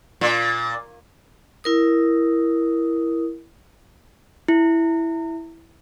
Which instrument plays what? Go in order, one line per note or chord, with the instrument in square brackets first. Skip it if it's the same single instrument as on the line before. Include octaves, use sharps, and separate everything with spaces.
[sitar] A#2
[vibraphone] E4 A#4 D#6
[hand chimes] E4